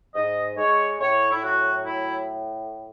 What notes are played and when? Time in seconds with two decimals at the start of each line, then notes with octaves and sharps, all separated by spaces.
0.14 G#2 D#5
0.57 G#3 C#5
1.00 A2 C#5
1.31 E4
1.43 F#3 F#4
1.85 A2 E4